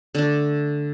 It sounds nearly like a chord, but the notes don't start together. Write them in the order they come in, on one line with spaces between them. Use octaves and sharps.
D3 D4 A3